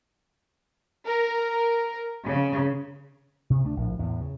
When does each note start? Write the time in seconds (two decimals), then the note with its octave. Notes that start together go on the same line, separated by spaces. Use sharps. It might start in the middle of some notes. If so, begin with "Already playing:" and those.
1.07 A#4
2.27 C#3
3.50 C3
3.63 D2 A3 D4
3.77 A#1 A2
3.99 E2 A2
4.21 C#3